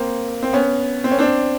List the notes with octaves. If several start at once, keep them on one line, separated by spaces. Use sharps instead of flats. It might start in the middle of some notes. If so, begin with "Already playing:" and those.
Already playing: A#3 C4
C4
B3 C#4
C4
C#4
C4 D4